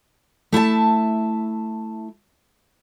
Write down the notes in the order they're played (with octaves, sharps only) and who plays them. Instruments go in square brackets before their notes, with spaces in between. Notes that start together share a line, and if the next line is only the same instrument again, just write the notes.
[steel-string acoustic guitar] A3 E4 E5 A5